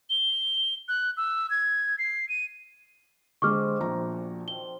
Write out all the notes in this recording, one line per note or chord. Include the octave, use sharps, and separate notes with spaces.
G7
F#6
E6
G#6
C7
D#7
D3 G#3 C4 F4 C5 C#6 D6 F6
A#1 B2 D4 F#4 A#5
A#2 A5
D#3 F3 C4 G7